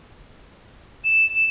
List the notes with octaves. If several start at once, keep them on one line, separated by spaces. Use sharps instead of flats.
E7